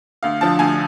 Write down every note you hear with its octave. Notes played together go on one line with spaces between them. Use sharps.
D2 F5
D3 F3 A5
D2 G#5